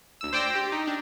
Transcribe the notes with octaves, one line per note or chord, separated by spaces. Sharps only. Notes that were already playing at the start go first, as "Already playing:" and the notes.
D2 E6
C5 D5 G5 C6 E6 A#6
G4
D#4
D4